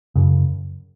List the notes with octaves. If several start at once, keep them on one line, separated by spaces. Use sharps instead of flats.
F#2 C#3